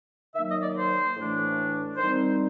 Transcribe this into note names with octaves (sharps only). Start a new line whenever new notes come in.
D#3 F#3 A#3 D#4 E5
D#5
D5
C5
A2 E3 A3 D4
D#3 G3 C4 D#4 C5